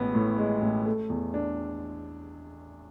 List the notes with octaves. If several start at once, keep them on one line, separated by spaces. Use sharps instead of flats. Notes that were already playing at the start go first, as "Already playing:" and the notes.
Already playing: A1 G#3 B3
A2
G#3
A1
A3
E2
D4